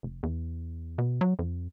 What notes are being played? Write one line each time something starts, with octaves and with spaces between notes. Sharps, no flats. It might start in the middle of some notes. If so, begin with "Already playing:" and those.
F1
E2
B2
F#3
F2